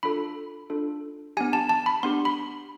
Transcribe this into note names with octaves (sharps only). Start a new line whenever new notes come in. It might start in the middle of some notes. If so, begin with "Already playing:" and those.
D4 F4 A4 B5
D4 F4 A4
B3 D4 G4 G#5
A5
A5
B5
B3 D4 G4 C6
B5